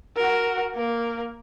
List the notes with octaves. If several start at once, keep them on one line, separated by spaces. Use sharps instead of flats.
F#4 A#4
A#3 A#4